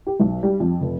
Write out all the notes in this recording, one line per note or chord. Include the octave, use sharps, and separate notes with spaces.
G4
B1
G3
F2
F1